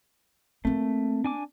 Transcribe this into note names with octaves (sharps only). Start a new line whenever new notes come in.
A3 A#3 C4
D4 G#5 D6